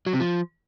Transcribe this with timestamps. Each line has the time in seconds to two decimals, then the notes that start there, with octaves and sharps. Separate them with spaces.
0.06 F#3
0.13 C3
0.20 F3